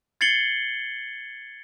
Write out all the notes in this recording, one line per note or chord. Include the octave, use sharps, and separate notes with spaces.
G#6 A6 C7 C#7 F#7 G7